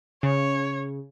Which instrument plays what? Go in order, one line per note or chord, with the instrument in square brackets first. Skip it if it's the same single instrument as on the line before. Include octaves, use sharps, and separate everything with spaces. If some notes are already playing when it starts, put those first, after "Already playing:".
[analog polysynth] C#3 [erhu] C#5